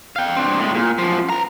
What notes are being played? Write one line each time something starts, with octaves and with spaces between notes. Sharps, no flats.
F5 G5
C4 D4
A2 G#3
A#2
F#2 F3
B4 A#5